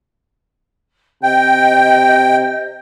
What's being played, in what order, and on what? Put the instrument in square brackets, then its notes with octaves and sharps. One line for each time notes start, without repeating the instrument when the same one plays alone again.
[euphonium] C3 [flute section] D#5 G6 [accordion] G5